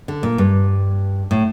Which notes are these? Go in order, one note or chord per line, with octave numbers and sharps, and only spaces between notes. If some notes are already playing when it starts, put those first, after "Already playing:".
D3
A#2
G2
A2